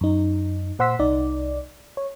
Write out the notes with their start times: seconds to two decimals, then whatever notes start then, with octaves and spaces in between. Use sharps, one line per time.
0.01 F#2 D#4
0.79 A#2 C5 F#5 C6 E6 B6
0.99 C2 D#4 D5
1.97 C#5